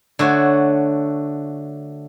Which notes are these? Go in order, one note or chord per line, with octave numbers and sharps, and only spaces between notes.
D3 A3 F#4 C#5